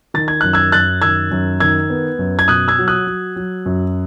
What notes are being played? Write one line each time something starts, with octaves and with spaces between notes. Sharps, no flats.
D#3 A6
G#6
F#2 F#6
E6 G#6
F#2 F#6 A6
D#3 E6 G#6
F#2
D#3 E6 G#6
B3
F#2
G#6
B2 D#6 F#6
E6 G#6
F#3
D#6 F#6
F#3
F#3
F#2